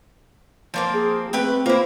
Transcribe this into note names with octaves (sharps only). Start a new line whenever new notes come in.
F3 A#3 C4
G#4
A3 C4 G4 B4
A#3 E4 F4 C5